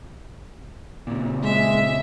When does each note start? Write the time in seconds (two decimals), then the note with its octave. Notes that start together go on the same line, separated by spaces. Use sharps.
1.07 A#2 C#3
1.44 G#3 E5